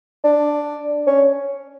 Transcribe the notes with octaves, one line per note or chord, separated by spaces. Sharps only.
D4
C#4